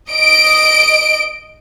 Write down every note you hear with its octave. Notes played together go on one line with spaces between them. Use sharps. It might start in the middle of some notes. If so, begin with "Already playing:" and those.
D#5 D7